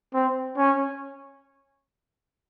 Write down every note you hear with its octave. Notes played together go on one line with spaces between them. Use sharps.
C4
C#4